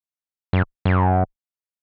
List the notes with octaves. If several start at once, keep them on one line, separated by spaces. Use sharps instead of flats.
F#2
F#2